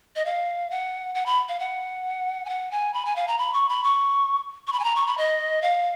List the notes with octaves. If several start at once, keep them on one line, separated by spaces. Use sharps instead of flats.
D#5
F5
F#5
F#5
B5
F5
F#5
G#5
F#5
G#5
B5
G#5
F5
A#5
B5
C#6
B5
C#6
C#6
B5
G#5
A#5
C#6
B5
D#5
F5